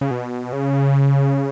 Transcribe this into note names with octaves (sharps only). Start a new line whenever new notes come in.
C#3
B2
C#3